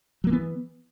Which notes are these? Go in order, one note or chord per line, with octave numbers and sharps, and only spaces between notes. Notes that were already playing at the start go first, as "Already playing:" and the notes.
E3 F#3 A#3 B3